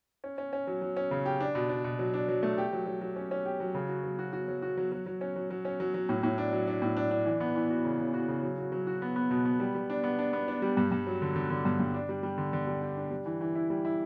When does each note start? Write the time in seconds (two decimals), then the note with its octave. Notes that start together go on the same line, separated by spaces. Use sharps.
0.24 C#4
0.38 C#4
0.53 C#4
0.67 F#3
0.82 F#3
0.97 C#4
1.11 C#3
1.26 G4
1.40 D4
1.55 B2
1.69 D4
1.84 B2
1.99 F#3
2.14 D4
2.28 F#3
2.43 A3
2.58 G4
2.73 F#3
2.87 F#3
3.01 F#3
3.16 C#4
3.31 C#4
3.45 G4
3.60 F#3
3.75 C#3
3.89 F#4
4.04 F#3
4.19 F#4
4.33 F#4
4.48 F#3
4.62 F#4
4.77 F#3
4.92 F#3
5.06 F#3
5.21 C#4
5.36 F#3
5.51 F#3
5.65 C#4
5.80 F#3
5.94 F#3
6.09 A2
6.23 A2
6.38 D4
6.53 F#3
6.67 D4
6.82 A2
6.97 D4
7.11 D4
7.26 E3
7.40 B3
7.55 E3
7.70 F#4
7.85 C#3
7.99 C#3
8.14 F#4
8.28 C#3
8.43 F#3
8.58 F#4
8.72 F#3
8.87 F#4
9.02 B3
9.16 B3
9.31 B2
9.45 B3
9.60 G3
9.75 G3
9.90 D4
10.04 B3
10.19 D4
10.33 B3
10.48 D4
10.62 G3
10.77 G2
10.92 G2
11.07 F#3
11.22 D3
11.36 D3
11.50 D3
11.65 G2
11.80 G2
11.94 D4
12.09 G3
12.23 G3
12.38 D3
12.53 D3
12.67 G3
12.82 G4
12.97 D4
13.11 G3
13.26 E3
13.41 E3
13.55 E4
13.70 G3
13.85 E4